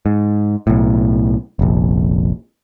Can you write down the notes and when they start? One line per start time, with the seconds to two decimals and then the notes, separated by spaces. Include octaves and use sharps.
0.06 G#2
0.67 B1 A2
1.59 F1 A#1